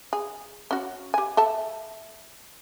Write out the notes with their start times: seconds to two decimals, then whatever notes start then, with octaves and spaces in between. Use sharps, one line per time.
0.13 G#4
0.71 C#4 F#4
1.14 G4 G#5
1.37 A4 E5 A5